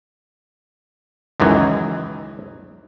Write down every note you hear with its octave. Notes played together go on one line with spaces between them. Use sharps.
C#2 F#2 D#3 E3